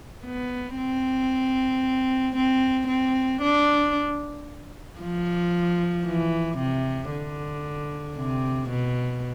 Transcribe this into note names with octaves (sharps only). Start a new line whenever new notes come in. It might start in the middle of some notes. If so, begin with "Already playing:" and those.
B3
C4
C4
C4
D4
F3
E3
C3
D3
C3
B2